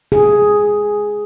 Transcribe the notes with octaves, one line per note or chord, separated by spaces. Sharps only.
G#4